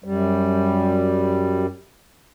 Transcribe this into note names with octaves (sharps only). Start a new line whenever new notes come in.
F#2 G3